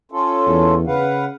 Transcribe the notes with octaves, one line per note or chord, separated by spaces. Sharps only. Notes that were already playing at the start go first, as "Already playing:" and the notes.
C#4 F4 A4
E2
C#3 B4 F5 F#5